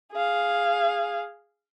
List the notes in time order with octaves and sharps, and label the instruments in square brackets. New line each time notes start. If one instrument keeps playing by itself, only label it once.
[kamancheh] G#4 F5